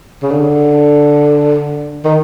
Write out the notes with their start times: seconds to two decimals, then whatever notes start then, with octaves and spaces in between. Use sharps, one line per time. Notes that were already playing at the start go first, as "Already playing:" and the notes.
0.23 C#3
0.31 D3
2.04 D#3